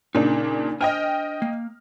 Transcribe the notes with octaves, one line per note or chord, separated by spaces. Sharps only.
A#2 C#3 D4 D#4
D4 C5 D#5 G5 G#5 F6
A#3